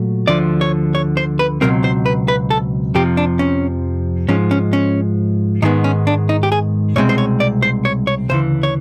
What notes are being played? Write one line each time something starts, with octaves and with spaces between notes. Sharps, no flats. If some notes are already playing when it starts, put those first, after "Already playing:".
Already playing: A#2 F#3 A3
D2 D3 F3 D5
C#5
C#5
C5
B4
C#2 B2 F#3 C4 A#4
C5
B4
B4
A4
F2 C3 F3 G4
D4
C#4
G#2 F3 G#3 C#4
C#4
C#4
G#2 D#3 G#3 B3 D#4
C#4
D4
D#4
G4
G#4
C2 B2 G#3 C4 C#5
C5
C#5
D5
C5
C#5
C#5
D2 C#3 E3 C5
C#5